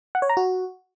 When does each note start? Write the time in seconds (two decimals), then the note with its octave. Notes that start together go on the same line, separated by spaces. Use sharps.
0.15 F#5
0.22 C#5
0.30 A#5
0.37 F#4